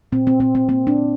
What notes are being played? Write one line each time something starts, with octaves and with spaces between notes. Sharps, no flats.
A#2 C4
C4
A#2 C4
C4
A#3 C4
D4
A#3